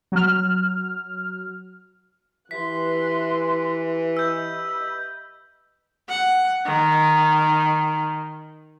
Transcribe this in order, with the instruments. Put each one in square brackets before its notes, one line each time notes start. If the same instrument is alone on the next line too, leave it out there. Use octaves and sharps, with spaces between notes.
[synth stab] F#3 F6
[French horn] E3 [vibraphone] G4 B4 E5 [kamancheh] C6 F#6 [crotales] B6
[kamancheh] D#5 B5 [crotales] E6 G6
[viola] F#5
D#3